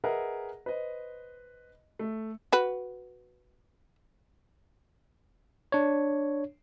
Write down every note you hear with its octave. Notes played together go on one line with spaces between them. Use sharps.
G#4 A#4 B4 D#5 E5 F#5
B4 C5 D#5
A3
F#4 B4
D4 C#5